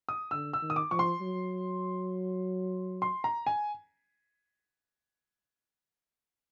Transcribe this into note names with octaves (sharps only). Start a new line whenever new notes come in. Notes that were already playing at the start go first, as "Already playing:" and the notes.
D#6
D3 E6
E6
D#3
D#6
D6
F3 C#6
C6
F#3
C6
A#5
G#5